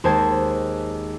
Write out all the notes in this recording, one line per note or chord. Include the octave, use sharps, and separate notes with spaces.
D#2 G#3 C5 A5 G#6